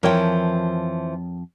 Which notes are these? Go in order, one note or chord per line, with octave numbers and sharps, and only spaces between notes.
F2 E3 F3 A#4 C#5 G5